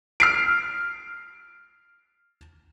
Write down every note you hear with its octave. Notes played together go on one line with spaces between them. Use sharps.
F6 C7 D7